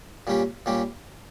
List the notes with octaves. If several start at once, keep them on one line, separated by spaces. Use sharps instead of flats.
A#2 G3 C#4 G4
A#2 G3 C#4 G4